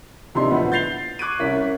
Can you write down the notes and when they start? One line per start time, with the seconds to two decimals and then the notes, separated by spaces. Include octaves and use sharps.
0.35 A#1 C3 D4 D#4 C6
0.50 A1 D2 F3 B3 F#5 B5
0.72 G6 A6 C7 F7 G7
1.19 C#6 D6 F#6 G#6 D7 D#7
1.39 C2 C#4 A#4 B6